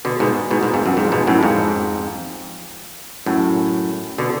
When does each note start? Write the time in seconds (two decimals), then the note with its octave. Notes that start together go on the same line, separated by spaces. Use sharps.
0.05 B2 D3
0.20 G#2 B2
0.51 G#2 B2
0.63 G#2 B2
0.74 F2 G#2
0.86 F#2
0.97 F2 G#2
1.12 G#2 B2
1.27 F#2 A2
1.43 F2 G#2
3.26 F#2 A2
4.18 B2 D3